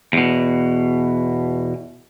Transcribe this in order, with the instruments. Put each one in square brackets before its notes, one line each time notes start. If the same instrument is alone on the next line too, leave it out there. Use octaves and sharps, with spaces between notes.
[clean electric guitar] E2 B2